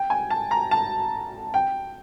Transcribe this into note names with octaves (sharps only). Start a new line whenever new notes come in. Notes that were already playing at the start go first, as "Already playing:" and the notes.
Already playing: G5
G#5
A5
A#5
A5
G5